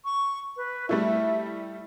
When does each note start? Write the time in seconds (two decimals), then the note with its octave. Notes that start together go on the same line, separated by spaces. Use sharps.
0.05 C#6
0.57 B4
0.89 G3 A3 E4 E5